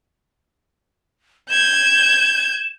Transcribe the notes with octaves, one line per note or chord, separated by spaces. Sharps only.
G6 G#6 E7